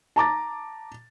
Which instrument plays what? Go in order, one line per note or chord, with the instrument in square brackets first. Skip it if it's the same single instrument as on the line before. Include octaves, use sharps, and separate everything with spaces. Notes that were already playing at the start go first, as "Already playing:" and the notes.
[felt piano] A5 A#5 D6 A6